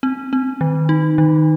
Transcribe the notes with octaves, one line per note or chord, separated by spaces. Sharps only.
C4
C4
D#3
D#4
D#3